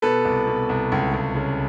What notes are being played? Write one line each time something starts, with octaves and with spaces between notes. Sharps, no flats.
B2 A4 B4
C2
B2
C2
C#2
C#2
C#3